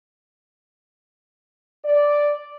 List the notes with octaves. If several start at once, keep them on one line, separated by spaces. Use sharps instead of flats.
D5